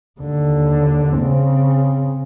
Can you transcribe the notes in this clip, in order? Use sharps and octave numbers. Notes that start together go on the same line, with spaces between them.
D#2 D3
C#3 C4